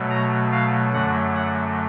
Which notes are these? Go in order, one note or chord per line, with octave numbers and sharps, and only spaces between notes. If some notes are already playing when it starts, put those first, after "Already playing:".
Already playing: B2 F#3 A3
A#5
F5
F#2 D3 F#3 A3 F#5
F#5